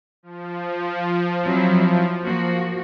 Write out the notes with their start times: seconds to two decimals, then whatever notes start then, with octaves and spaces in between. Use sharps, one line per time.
0.23 F3
1.46 F#3 C4 E4
2.24 F3 A#3 F#4